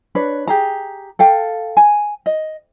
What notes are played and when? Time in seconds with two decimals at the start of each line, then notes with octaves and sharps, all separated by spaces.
0.15 D4 B4 C#5
0.48 G4 G#4 A#5
1.19 A4 F5 G5
1.77 G#5
2.26 D#5